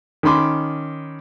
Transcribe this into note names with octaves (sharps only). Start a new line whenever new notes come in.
D#3 C#4 B5 C6 D6